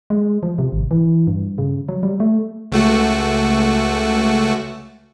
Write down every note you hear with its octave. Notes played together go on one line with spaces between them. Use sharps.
G#3
F3
C3
G#1
E3
G2
C#3
F#3
G3
A3
C#2 A3 F#4